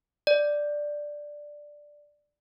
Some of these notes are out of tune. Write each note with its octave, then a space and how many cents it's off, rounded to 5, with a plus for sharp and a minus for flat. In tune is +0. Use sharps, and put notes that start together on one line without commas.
D5 +5